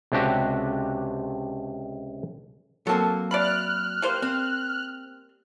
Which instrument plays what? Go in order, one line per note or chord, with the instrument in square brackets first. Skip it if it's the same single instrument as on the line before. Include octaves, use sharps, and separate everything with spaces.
[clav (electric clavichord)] C#2 C3 D4 F#4 G4
[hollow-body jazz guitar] F#3 A#3 C4 [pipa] A4 A5
[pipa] D5 E5 B5 [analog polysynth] F6 F#6
[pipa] G3 A#3 C5
[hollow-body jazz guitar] C4